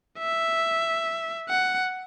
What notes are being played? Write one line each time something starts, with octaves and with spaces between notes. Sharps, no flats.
E5
F#5